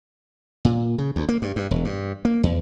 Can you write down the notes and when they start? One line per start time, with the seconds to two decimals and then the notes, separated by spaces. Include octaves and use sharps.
0.65 A#2
0.98 C#3
1.16 D2
1.29 A#3
1.42 G2
1.56 G2
1.71 E1
1.85 G2
2.25 A#3
2.43 E2